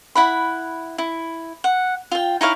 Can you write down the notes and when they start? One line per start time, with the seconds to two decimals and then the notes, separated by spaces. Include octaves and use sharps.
0.15 E4 F#5 B5
0.98 E4
1.64 F#5
2.12 F4 G5
2.41 D#4 E4 C#5 F5